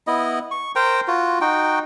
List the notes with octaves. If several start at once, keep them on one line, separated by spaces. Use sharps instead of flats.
B3 E4 D#5
C#6
A#4 C5 G5 A#5
F4 F#4
D#4 F#4 G5